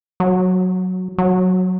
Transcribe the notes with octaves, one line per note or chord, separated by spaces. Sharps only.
F#3
F#3